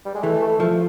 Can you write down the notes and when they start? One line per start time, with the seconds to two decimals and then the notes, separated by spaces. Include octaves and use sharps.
0.05 G3
0.15 G#3
0.23 E3 A3
0.42 A3
0.60 F3 A3